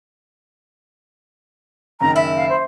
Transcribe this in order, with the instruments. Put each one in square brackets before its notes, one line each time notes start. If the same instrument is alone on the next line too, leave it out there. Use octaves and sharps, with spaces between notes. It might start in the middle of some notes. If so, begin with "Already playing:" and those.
[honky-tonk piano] F#1 D#3 [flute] A#5
[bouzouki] E4 [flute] E5
[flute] F5
C5